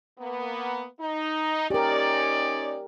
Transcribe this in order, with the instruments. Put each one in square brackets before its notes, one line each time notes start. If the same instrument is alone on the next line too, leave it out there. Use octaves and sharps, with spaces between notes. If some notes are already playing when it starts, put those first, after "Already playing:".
[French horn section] A#3 B3
D#4
[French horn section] C#4 D#4 D5 [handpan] G4 A#4